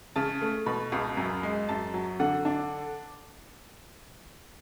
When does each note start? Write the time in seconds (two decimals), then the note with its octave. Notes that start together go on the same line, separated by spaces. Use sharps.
0.16 C#3 A5
0.41 A3
0.66 B2 B5
0.92 C#2
1.17 F#2
1.43 G#3
1.69 F#2 A5
1.94 F#3
2.20 D3 F#5
2.45 D4